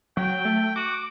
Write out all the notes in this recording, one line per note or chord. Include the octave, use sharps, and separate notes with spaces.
F#3 G5
A3
F#4 D6